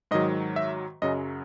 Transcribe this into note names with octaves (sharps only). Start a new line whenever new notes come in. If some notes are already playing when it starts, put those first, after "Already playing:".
G#2 D#3 F#3 D#5
E5
F#2 C#3 F#3 D#5